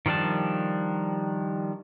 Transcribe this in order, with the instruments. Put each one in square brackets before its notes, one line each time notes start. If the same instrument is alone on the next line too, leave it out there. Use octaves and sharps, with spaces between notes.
[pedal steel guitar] D#3 F3 G3 D4 A5